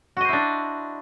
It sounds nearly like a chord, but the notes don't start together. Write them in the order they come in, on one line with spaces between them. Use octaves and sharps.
F#4 D#5 C5 E4 D4